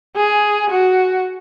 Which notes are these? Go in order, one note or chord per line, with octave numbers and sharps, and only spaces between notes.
G#4
F#4